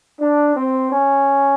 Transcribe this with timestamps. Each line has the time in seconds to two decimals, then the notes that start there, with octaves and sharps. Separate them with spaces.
0.19 D4
0.55 C4
0.90 C#4